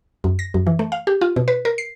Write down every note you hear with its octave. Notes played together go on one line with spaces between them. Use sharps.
F#2
A#6
F#2
E3
A3
F5
G4
F4
B2
B4
A#4
C7